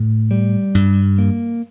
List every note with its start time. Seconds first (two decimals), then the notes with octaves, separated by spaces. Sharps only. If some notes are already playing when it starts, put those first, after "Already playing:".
Already playing: A2
0.31 G3
0.75 G2
1.18 A#3